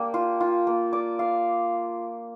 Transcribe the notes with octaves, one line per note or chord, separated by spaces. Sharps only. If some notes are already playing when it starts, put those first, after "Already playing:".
Already playing: A#3 D4 G4
F4
F4
A#3
D5
F5